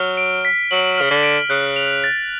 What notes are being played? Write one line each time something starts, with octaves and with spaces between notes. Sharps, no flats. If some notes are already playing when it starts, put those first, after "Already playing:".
Already playing: F#3 F6
D7
B6
F#3 F#7
C#3 F6
D3
D7
C#3 F#6
F7
A6